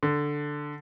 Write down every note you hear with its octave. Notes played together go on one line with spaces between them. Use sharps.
D3